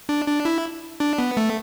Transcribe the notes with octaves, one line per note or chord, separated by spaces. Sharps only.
D4
D4
E4
D4
B3
A3